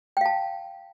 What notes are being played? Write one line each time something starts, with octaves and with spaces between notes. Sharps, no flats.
F5 G5 A5